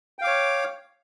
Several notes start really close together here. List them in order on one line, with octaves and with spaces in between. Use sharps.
G5 F5 D6 C#5